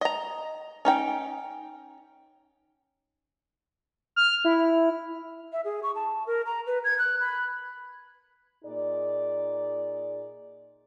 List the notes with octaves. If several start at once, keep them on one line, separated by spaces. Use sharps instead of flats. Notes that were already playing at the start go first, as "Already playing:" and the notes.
D#5 A#5
C#4 D#4 G5
F6
E4
E5
G#4
C#6
A5
A#4
A#5
B4
G#6
F#6
B5
A#2 D#4 G#4 D5